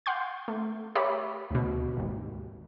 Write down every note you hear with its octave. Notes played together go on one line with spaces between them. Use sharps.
F5 F#5 C6 G6
A3
G4 A#4 C#5 E5 B5 D6
D2 B2
G#1 D#2